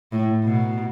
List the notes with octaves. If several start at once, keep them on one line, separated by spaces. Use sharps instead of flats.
A2
B2